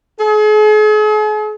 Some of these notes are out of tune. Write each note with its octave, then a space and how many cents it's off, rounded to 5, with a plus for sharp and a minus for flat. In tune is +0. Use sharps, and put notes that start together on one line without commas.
G#4 +45